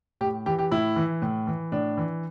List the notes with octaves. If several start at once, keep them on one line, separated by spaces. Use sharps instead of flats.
A2 G4
E3 G4
G4
A2 E4
E3
A2
E3
A2 D4
E3